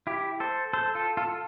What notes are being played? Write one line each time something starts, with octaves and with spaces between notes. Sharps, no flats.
E4 G4
A4 C5
A4 C5
F4 A4
F4 A4